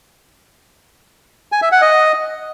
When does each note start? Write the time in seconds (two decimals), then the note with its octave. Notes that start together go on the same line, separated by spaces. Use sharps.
1.52 G#5
1.62 E5
1.72 F#5
1.82 D#5